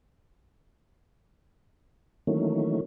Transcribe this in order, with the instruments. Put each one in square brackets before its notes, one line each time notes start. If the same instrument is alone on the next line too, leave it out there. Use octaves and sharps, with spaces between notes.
[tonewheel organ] D#3 E3 F#3 A3 A#3 C#4